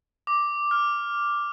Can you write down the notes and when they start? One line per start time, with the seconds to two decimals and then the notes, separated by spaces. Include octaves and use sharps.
0.27 D6
0.71 F6